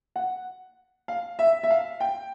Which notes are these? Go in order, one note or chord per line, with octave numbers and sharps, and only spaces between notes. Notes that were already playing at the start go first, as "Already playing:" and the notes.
F#5
F5
E5
E5
F5
G5